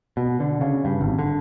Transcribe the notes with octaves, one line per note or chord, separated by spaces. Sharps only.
B2
D3
C#3
G2
G#1
D3